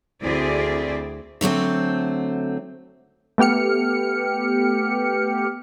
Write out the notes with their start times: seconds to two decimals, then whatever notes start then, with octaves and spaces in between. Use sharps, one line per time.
0.21 D2 C4 E4 G#4 C5 D5
1.41 D3 F#3 A3 C4
3.38 A3 B3 G4 F6 C#7